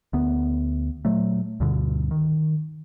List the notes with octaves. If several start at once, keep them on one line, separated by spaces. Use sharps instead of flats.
D2 B3
A#2 F#3 A3
D2 G2 B2 D3
D#3